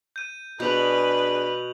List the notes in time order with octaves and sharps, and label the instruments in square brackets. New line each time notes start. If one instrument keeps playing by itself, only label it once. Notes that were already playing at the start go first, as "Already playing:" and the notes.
[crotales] G6 D#7
[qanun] B2 [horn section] D4 G#4 [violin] B4 [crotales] G6 F7 F#7